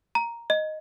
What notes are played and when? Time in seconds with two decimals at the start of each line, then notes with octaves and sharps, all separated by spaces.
0.15 A#5
0.50 D#5